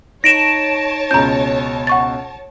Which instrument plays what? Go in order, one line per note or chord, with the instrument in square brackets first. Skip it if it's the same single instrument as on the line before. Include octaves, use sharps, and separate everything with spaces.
[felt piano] D#4 [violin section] C#5 A5 [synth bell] A#6 D7 E7
[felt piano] C#2 B2 C#4 [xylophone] A#5 G6
[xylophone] F#5 C#6 A6